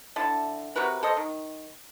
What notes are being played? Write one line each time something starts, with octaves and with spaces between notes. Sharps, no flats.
D3 E4 A5
C3 F#4 A#4 B4
A4 C5 D#5
D#3